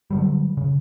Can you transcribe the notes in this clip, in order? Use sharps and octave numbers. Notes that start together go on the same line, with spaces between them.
D3 F#3 G3
C#3